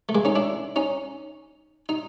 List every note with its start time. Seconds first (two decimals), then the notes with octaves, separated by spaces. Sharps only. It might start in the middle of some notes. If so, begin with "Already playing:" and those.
0.09 A3
0.15 G#3 A#3
0.25 C#4 D#4
0.35 D4 E4
0.76 C#4 D#4
1.89 D#4